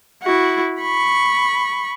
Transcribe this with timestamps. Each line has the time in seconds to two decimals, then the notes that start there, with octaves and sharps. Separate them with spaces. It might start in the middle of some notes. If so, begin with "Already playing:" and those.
0.23 E4 F#4
0.81 B5 C#6